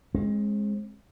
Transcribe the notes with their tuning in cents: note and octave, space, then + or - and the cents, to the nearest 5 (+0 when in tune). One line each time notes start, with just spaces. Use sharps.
G#3 +0 C4 +45